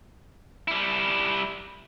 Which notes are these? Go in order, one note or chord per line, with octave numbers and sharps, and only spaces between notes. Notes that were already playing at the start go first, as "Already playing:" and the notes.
G3 E4